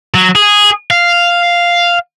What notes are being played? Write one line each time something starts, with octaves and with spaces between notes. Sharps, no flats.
F#3
G#4
F5